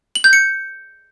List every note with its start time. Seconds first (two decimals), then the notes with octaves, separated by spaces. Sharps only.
0.15 F#7
0.24 G6
0.33 C#7